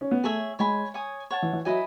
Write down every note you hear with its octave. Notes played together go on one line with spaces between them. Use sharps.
C#4
B3
A3 G#4 C#5 E5
G#3 C#5 G#5 B5
C#5 G#5 D#6
C#5 F#5 A5
E3
E3
F#3 E4 B4 D#5 G#5